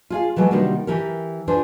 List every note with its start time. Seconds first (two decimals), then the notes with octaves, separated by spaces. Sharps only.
0.10 F4 G#4 F5
0.36 E3 F#3 G#3 A3
0.51 C3 D#3 G3 A#3 D4 F#4
0.87 E3 G4 A#4
1.48 D4 F4 G#4 B4 C5